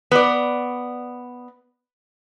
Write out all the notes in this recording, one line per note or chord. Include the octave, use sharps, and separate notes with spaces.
B3 D5